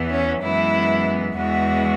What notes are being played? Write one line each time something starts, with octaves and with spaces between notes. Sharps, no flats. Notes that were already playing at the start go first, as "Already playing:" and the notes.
Already playing: E2 E3 B3
C#4
F#2 E3 G#3 B3 E4
E2 E3 G#3 B3 F#4